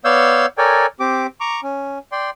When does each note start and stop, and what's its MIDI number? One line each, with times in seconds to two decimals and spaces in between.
0.05 0.46 59
0.05 0.46 73
0.05 0.46 74
0.05 0.46 77
0.05 0.46 88
0.05 0.46 91
0.58 0.86 69
0.58 0.86 70
0.58 0.86 73
0.58 0.86 74
0.58 0.86 79
0.58 0.86 80
1.00 1.27 60
1.00 1.27 67
1.00 1.27 86
1.40 1.60 82
1.40 1.60 85
1.40 1.60 86
1.63 1.98 61
2.12 2.30 74
2.12 2.30 79
2.12 2.30 84